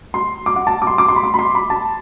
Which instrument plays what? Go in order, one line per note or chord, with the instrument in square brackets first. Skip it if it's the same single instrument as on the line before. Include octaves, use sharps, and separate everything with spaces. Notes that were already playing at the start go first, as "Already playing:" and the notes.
[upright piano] C6
D6
F#5
A5
D6
C6
D6
C6
B5
C6
B5
C6
B5
A5